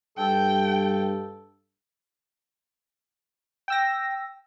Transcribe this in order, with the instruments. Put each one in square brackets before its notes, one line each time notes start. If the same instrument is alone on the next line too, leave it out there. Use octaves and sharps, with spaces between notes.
[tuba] G2 [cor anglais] A4 [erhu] G5
[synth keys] G5 E6 A#6